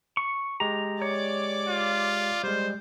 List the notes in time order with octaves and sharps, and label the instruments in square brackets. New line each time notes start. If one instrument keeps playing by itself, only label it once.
[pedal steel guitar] C#6
[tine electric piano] G#3 G4 [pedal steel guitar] A#5
[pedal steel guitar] C#5 [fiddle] D5 D6
[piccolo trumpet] F4
[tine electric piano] G3 G#3 [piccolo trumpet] C5